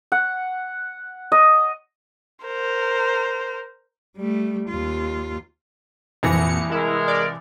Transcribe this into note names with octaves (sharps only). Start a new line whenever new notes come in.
F#5
D#5
A#4 C5
G3 A3
D#2 F4
C2 F2 A#2 E3 A#6 C#7
G#3 E4 A#4
D5